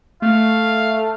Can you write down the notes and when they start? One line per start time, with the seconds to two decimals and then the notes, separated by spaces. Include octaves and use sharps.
0.22 A3 F5